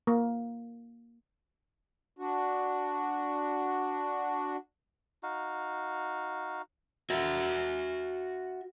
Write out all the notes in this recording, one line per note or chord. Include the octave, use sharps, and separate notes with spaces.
A#3
D4 F#4
D#4 F#4 F5
F#4 E5